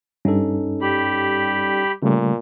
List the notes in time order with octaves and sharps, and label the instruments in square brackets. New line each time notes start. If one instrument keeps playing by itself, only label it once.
[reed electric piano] G2 [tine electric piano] C#4 D#4 A4
[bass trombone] G3 [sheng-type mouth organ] G4 B5
[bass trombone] A#2 [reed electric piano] C#3 G3 A3